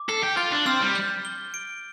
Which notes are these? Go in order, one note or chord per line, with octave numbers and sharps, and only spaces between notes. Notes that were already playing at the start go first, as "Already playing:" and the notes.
Already playing: D6
A4 C7
G4
F4 A6
D4
C4 F6
G3
G6
G7
D7